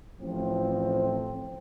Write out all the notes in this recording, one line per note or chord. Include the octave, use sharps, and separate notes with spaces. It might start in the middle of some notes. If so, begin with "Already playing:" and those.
A1 A2 F3 C4